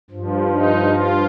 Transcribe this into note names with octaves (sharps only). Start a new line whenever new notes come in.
G2 F3
D#4
F4